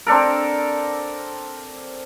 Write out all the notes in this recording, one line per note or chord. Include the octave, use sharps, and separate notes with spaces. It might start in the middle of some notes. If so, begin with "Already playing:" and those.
C4 D4 A4 A#4